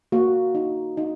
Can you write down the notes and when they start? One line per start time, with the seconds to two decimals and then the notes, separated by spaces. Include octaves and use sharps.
0.12 A#3 F#4
0.55 D#4
0.97 D#4